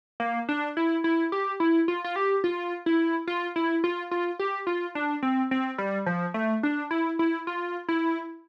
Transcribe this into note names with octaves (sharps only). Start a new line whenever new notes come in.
A#3
D4
E4
E4
G4
E4
F4
F4
G4
F4
E4
F4
E4
F4
F4
G4
F4
D4
C4
C4
G3
F3
A3
D4
E4
E4
F4
E4